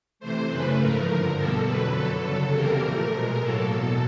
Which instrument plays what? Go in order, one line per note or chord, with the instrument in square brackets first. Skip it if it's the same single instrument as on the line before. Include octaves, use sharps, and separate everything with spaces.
[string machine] C3 E3 A3 C5
F#2 C#3 E3 A3 B4
G#2 F3 A3 A#4
G2 D3 F3
E2 B2 G3 A#3 A4
F2 D3 F#3 B4
F#2 D3 F#3 A4
E2 C#3 F#3
E2 C3 E3 G3 A#3 A#4
A#2 F3 A3
B2 G#3 A#4
A2 F#3 A#3 A4
E2 B2 F#3